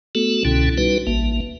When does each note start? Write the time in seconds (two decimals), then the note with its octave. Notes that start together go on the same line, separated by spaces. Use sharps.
0.15 A3 B3 F#4 A4
0.45 C2 B2 D3 C#4 E4
0.78 G3 D#4 F#4 B4
1.07 A1 A#3